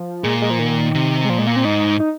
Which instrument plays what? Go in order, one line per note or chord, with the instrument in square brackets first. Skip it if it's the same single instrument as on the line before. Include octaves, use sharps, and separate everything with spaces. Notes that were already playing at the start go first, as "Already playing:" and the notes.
Already playing: [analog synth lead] F3
[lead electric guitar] A#2 [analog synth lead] G#3
[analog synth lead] G#3
F3
D#3
[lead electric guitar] C3
[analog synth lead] G#3
[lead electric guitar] A#2 [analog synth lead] F3
[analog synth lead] G#3
A#3
C4
[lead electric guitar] G#2 [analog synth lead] D#4
[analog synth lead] D#4